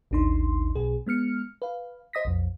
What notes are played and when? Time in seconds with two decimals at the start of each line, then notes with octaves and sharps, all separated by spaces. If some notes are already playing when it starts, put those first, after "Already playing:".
0.11 A1 D#2 D4 D#4 C6
0.75 B1 B2 G#4
1.07 G#3 B3 F6 C#7
1.62 B4 F5
2.13 C5 D#5 D#6 A#6 B6
2.25 B1 F2